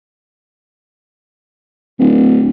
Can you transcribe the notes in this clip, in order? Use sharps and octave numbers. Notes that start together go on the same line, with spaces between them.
D1